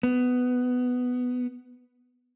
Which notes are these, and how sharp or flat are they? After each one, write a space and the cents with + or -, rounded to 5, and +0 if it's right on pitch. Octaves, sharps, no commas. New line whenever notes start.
B3 +10